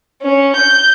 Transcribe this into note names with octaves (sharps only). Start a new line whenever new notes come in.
C#4
G6